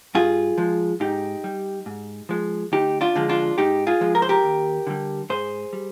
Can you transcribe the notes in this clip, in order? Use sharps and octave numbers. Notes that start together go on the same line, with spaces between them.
G2 F4 G#4
F3 G#3
G#2 D#4 G4
G3
G#2
F3 G#3
D2 D#4 G4
D4 F4
D3 F3 G#3
D4 F4
G#2 D#4 G4
F4 G#4
F3 G#3
A#4
C5
G4 A#4
D#2
D3 G3
G#2 G#4 C5
G3